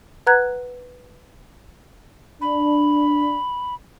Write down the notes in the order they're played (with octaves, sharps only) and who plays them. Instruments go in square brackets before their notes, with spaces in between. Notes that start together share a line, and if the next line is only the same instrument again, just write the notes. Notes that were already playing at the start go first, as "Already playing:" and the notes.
[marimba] B4 F#5 A#5 F#6 G#6
[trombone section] D4 [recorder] B5